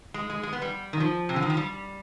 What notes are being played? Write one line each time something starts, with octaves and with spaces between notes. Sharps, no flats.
G#3
G#3
G#3
B3
G3
D#3
F3
C3
D3
D#3
F3
G3